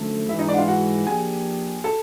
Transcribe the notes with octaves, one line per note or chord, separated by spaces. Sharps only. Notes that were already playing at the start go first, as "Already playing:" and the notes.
Already playing: F#2 D3 F3 A3
G#2 E3 G#3 E4 E5
D#4 D#5
D4 D5
F#5
F4 F5
F#4 F#5
F3 A#3 D4 G4 G#4 G#5
A4 A5